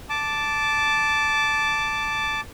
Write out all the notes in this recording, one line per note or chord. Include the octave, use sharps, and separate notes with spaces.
A5 D6